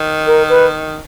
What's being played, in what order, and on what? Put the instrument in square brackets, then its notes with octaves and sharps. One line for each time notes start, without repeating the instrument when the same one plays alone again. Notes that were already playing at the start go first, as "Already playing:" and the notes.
Already playing: [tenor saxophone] D#3
[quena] A#4
B4